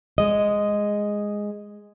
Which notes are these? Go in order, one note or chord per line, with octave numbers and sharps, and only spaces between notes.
G#3 D#5